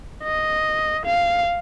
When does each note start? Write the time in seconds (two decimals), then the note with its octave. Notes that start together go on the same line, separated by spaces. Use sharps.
0.23 D#5
1.05 F5